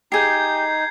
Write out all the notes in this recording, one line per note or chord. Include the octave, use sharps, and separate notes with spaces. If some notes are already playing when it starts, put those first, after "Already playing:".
D#4 G4 G#4 G6 G#6 C7